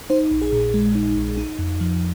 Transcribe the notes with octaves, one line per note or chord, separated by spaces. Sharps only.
D#4 C5
A#1
G#4
A#2
G#3
D#4
A#1
D#4
F2
F3